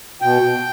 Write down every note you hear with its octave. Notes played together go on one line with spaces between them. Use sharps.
B2 G5